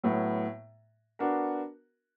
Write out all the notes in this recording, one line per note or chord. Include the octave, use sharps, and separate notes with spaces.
A2 F#3 B3
B3 D4 F#4 A#4